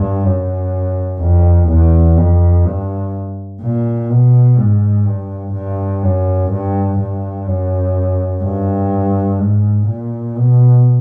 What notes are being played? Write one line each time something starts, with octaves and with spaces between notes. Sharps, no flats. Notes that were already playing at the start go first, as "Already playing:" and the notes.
Already playing: G2
F#2
F2
E2
F2
G2
A#2
B2
G#2
G2
G2
F#2
G2
G2
F#2
G2
G#2
A#2
B2